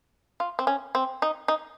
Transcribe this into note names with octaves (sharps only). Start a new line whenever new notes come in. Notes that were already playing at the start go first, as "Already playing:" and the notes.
F4
C4
C#4
C4
D#4
D#4